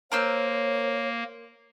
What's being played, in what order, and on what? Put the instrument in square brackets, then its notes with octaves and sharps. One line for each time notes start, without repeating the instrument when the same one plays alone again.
[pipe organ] A#3 [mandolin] A#4 C5 E6 [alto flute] C#5